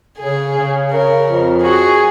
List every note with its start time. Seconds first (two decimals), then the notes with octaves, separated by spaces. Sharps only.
0.19 C#3 G#4
0.55 C#3
0.90 C#3 A#4
1.27 F2
1.63 F#4 G#4